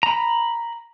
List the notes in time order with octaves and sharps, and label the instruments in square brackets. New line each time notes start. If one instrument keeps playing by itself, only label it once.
[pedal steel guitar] A#5 B5